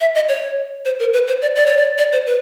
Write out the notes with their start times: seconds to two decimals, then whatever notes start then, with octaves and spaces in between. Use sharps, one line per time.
0.01 E5
0.15 D#5
0.29 C#5
0.85 C5
1.00 A#4
1.13 B4
1.28 C5
1.42 D5
1.56 D5
1.66 C#5
1.77 D5
1.98 D5
2.12 C5
2.27 B4